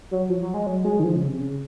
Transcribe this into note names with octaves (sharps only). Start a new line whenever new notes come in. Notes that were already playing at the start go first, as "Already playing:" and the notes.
F#3
F3
F#3
G#3
F#3
G#3
D#3
F3
C#3
C3
C#3